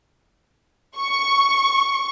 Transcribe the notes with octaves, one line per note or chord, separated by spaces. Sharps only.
C#6